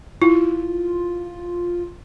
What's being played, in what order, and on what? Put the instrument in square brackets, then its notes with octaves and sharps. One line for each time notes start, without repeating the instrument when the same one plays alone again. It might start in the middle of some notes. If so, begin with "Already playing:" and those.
[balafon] E4 [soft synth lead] F4